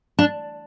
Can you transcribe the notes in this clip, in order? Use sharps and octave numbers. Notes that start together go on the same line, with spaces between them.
D4